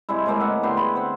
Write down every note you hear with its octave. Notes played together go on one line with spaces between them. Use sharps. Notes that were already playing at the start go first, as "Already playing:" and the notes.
C3 G3 G#3 E4
A2 G#3 A#3 C4
D#5 E5 F#5
D3 B3 G4 C6
G#4 B5
C4 C5 F#5